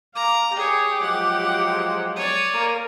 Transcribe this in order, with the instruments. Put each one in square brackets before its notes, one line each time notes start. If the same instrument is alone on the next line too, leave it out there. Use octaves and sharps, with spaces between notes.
[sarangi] F5 [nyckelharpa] A#5 [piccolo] D6
[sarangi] G4 [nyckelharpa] G#4 C#5 [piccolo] D6
[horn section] F3 F#3 G#3 [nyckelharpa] F#5
[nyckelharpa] C#5 D5 [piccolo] D#7
[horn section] A#3 [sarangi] A#4